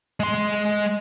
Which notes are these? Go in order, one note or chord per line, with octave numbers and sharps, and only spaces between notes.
G#3 C6